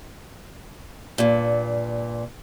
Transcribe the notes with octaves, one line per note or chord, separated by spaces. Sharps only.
G2 A#2